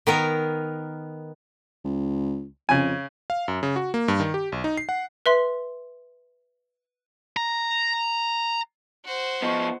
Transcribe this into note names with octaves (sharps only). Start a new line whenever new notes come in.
D#3 B3 A#4
C#2
F2 C#3 G#5
F5
F#2
C#3
F#4
A#3
G2
D#3
G4
B1
D#4
C7
F#5
B4 E5 C6
A#5
F#4 C5
F3 B3 D#5 C#6